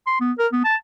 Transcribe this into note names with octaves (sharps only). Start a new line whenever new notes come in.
C6
B3
A#4
B3
A5